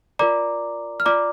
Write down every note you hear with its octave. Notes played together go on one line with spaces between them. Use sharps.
F4 A#4 D5 A#5 D6
F6
F4 D5 A#5 D6